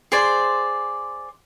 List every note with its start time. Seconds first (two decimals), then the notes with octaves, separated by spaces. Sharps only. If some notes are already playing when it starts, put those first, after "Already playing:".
0.12 G#4 C5 D5 C6